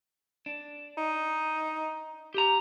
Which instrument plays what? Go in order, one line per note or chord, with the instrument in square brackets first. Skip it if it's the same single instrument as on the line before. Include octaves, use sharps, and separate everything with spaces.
[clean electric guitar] D4
[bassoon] D#4
[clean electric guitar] G4 A#5